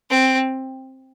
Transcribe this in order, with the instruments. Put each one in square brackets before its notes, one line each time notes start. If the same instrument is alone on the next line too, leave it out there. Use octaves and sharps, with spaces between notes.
[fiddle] C4